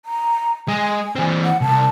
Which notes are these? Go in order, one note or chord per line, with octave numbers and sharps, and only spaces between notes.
A#5
G#3 G#5
E3 C4
F#5
C2 A5